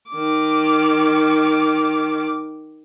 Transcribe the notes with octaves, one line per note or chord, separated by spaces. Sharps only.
D#3 D6